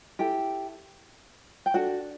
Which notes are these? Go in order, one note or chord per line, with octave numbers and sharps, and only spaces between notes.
E4 G4 A4 G5
G5
D4 F#4 A4 F#5